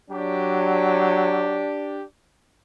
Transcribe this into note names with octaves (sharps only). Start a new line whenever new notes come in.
F#3 D4 G4